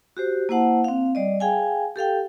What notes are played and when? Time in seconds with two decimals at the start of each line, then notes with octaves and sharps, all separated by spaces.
0.17 F#4 G4 C5
0.49 A#3 E4 C5 F#5 A5
0.84 C4 F5
1.15 G3 D5 D#5
1.40 G#4 F5 G5 G#5
1.96 G4 A4 F5 G5